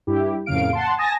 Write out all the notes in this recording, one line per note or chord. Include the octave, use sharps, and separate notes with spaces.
G2 E4 G4
F2 A2 C#3 A#3 F5 D7
F#5 A5 C6
G#5 A5 D#6 A#6